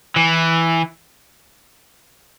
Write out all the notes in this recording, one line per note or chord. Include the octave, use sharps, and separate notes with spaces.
E3